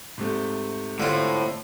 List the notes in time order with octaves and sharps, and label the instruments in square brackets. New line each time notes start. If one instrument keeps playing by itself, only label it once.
[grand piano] G#2 C3 A3
[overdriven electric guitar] A2 [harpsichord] D3 F4 [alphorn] C5